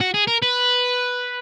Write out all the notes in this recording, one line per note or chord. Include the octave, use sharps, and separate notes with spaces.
F#4
G#4
A#4
B4